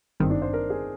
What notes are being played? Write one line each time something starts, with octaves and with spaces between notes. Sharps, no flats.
G#1 G2 D#3 C4
D#4
D4
C5
A#4
G#4